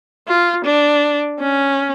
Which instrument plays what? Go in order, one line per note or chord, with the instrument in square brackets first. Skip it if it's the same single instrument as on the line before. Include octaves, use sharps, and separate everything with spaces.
[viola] F4
D4
C#4